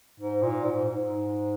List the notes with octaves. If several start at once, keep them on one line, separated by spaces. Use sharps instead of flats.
G#2
A#2
G#2
G#2